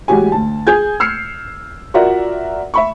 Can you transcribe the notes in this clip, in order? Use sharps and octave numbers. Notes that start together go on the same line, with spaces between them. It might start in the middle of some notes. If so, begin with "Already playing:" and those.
A1 G#3 F#4 G4 G#5
D2 A5
G#4 G#5 G6 G#6
E6 F6 C7 C#7
F4 F#4 A#4 D5 E5 F#5
E5 B5 C#6